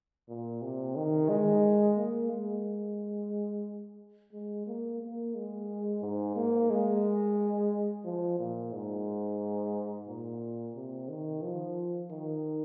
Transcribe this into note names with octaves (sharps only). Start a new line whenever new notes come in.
A#2
C3
D#3
G#3
A#3
G#3
G#3
A#3
A#3
G#3
G#2
A#3
G#3
F3
A#2
G#2
A#2
C3
D#3
F3
D#3